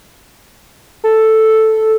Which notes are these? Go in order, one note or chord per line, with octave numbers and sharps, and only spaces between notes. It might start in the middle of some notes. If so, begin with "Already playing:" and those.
A4